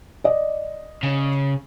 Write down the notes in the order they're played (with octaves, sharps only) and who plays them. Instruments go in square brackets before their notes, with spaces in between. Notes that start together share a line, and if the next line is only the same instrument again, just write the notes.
[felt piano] D5 D#5
[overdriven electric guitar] C#3